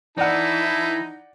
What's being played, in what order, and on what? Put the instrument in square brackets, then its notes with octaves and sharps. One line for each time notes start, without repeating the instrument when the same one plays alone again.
[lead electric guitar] E3 [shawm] D#4 [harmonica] E4 A5 [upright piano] D5 F#5